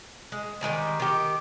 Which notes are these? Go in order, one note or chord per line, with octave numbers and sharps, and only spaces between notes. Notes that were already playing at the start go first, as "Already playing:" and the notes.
G#3
D#3 G3 G#3 C4
D#3 G4